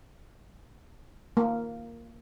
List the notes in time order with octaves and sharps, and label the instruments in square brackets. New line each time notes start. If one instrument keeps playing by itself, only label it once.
[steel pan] A#3